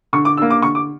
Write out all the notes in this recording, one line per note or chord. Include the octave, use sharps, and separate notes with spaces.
D3 C#6
D6
A#3 D4 E6
D6
D3 C#6
D6